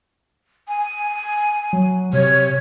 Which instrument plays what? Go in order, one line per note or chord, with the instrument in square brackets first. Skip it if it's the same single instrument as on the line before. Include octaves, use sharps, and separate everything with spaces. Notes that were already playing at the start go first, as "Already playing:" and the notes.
[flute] G#5
[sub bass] F#3
[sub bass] C3 [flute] C#5